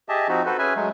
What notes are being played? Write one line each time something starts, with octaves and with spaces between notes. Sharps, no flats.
G4 G#4 D#5 E5 A5
F3 C4 D#4 F#4
F#4 A4 B4 C5
C#4 G#4 B4 E5 G#5
F#3 G#3 A3